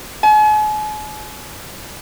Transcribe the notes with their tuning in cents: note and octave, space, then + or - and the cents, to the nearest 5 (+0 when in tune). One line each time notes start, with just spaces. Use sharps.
G#5 +45